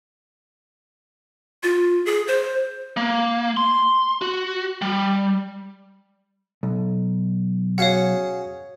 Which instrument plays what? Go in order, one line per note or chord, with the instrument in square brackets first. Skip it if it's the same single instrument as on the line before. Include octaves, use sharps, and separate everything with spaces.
[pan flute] F4
G#4
C5
[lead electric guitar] A#3
C6
F#4
G3
[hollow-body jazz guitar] B1
[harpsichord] C#4 F#4 G#4 [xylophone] C#5 F5 F#5